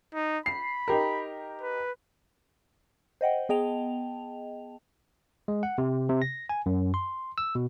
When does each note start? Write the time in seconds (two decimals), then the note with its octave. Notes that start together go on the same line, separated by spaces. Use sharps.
0.14 D#4
0.46 B5 C7
0.88 D#4 G4 A#4
1.61 B4
3.21 C5 D#5 F#5 G5
3.49 B3 G#4 D#5 G5 A5 F7
5.48 G#3
5.63 F#5
5.78 C3
6.09 C3
6.22 A#6
6.49 G#5
6.66 F#2
6.94 C6
7.38 E6
7.55 B2